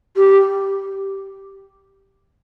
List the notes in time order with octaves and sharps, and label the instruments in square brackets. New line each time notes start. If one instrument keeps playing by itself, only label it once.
[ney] G4